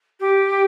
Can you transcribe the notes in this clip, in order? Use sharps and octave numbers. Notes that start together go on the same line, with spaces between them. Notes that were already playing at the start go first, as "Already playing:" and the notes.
G4